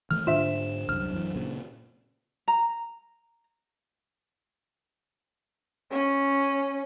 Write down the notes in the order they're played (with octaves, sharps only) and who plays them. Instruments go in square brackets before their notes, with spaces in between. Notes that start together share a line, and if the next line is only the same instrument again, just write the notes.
[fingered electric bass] D#3 E3 A3 [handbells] F6
[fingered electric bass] G#2 D3 [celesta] D4 C5 E7 [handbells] F4 E5
[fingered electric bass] C2 F#2 [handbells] F6
[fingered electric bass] F#2 E3
A#2 C#3
[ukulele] A#5
[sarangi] C#4